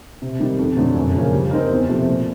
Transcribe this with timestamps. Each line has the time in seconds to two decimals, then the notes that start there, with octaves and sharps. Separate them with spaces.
0.22 C3
0.39 D#3 G3
0.59 F2
0.77 D3 F#3 A3 D4
0.96 F#2
1.14 C#3 F3 A#3 C#4
1.32 G3
1.51 C4 D#4 G4 A#4
1.70 E2
1.88 C3 F3 A3
2.06 A#2